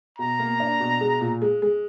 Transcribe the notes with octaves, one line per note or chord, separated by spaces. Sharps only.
B2 A#5
A#3
D4
B2
G#3
A#2
G#3
G#3